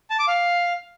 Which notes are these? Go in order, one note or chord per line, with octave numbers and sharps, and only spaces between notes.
A5
D6
F5